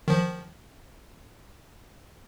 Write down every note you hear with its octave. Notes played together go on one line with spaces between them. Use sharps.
D#3 F3